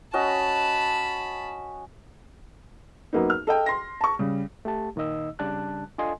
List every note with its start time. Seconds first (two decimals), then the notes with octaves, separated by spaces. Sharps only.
0.13 C#4 F#4 D#5 A5 B5
3.13 F#2 A#3 B3 D#4
3.30 F6
3.47 A4 D#5 G5
3.66 C6 A#6
4.01 A5 C#6
4.19 C#3 G3
4.65 A3 G4 A5
4.96 A#2 D#3 D#4 D#5 E6
5.39 C#3 G3 D4 A5 F#6
5.98 D4 F4 A4 D#5 G#5 C6